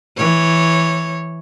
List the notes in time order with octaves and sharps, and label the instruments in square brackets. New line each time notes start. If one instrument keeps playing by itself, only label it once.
[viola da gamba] E3 C#5